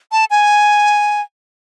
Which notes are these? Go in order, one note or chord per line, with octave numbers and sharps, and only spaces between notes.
A5
G#5